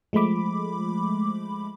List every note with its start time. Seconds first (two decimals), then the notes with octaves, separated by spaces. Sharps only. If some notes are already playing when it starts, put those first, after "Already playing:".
0.13 F3 G#3 A3 B5 D6